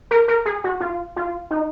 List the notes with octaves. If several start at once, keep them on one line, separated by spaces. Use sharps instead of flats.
A#4
A#4
G#4
F#4
F4
F4
D#4